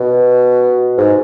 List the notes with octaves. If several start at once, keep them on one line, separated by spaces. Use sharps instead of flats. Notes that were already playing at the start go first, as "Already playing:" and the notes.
Already playing: B2
G#2